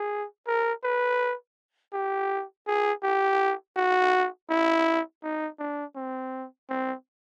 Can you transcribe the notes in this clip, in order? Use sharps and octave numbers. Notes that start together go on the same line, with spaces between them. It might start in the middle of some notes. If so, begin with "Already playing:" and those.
Already playing: G#4
A#4
B4
G4
G#4
G4
F#4
E4
D#4
D4
C4
C4